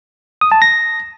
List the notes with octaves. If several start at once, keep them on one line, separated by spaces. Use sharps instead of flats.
D#6
A5
A#6